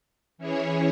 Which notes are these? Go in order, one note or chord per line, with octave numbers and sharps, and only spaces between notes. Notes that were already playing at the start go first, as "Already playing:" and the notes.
E3 C#4 E4 G#4 C#5